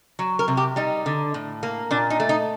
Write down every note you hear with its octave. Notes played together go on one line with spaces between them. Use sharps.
F#3
A#4
C3
G4
G3 D#4
D3
A2
A#3
A#2 D4
D#4
A3
D#4